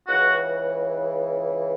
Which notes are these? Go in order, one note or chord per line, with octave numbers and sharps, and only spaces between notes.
C#2 C#3 E3 F#4